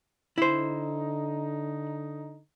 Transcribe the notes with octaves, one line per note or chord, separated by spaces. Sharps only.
D3 D#4 E4 C5